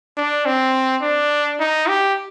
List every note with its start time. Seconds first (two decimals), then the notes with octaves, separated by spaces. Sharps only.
0.17 D4
0.45 C4
1.02 D4
1.60 D#4
1.88 G4